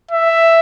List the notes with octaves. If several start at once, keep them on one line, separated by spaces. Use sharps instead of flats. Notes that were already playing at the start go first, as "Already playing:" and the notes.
E5